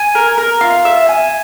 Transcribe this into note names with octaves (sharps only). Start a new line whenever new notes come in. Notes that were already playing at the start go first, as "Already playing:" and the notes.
Already playing: G#5
A#4
A#4
F4
E5
G#5